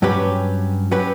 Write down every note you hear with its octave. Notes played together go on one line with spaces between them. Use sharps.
G2 F#3 C#4 G4 B4
F#3 C#4 G4 B4